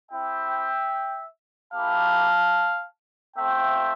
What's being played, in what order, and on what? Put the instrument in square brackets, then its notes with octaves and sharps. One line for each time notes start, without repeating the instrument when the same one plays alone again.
[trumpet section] C4 E4 G4 E5 G5
A#3 E4 G4 F5 A5
A3 C4 F4 E5 G5